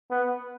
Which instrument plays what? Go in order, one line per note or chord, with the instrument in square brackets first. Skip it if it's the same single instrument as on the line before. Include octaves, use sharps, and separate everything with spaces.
[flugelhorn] B3